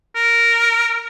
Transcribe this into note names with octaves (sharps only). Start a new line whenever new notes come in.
A#4